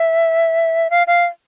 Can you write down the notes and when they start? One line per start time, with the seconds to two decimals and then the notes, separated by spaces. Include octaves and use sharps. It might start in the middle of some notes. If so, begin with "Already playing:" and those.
Already playing: E5
0.90 F5
1.07 F5